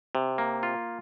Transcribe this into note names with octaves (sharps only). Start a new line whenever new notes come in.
C3
A#3
F4